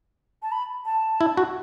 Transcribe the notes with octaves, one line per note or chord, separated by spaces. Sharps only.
A5
B5
A5
E4
F#4